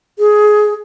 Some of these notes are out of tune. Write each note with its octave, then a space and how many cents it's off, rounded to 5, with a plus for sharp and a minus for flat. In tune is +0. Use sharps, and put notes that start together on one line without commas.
G#4 +15